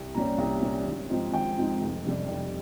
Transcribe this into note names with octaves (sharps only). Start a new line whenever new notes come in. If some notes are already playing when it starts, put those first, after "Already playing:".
Already playing: C2
A#2 G3 C#4 A#5
C2 A#5
A#2 G3 C#4
G#1
G#2 F3 C4 D#4
G#1 G5
G#2 F3 C4 D#4
F1
F2 C3 G3
F1